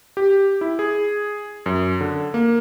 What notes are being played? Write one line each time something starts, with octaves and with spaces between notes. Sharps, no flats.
G4
E4
G#4
F#2
D3
A#3